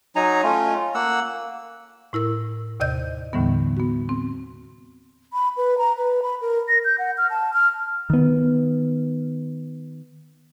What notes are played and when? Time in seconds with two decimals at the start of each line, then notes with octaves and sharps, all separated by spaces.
0.16 F#3 D#4 G#5 A#5
0.43 A3 C#4 F4
0.95 A#3 F#5 E6
2.13 A2 E4 A#4 E6
2.80 D#2 C3 D5 D#5 G6
3.33 D#2 A2 D3 E3 G3 B3
3.77 B3 F#4
4.09 C4
5.33 B5
5.57 B4
5.78 A#5
5.97 B4
6.22 B5
6.41 A#4
6.68 A#6
6.85 G6
6.99 F#5
7.18 F6
7.30 A5
7.53 F6
8.10 D#3 B3